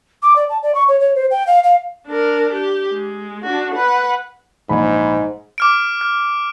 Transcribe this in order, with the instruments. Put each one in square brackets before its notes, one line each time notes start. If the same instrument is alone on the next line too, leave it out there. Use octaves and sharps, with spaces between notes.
[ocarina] D6
D5
A5
D5
C#6
C#5
C#5
C5
G5
F5
F5
[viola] D4 A#4
G4
G#3
D4 F#4
B4 F#5
[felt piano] A#1 B5 [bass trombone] G#2
[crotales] D6 F6 D7
F6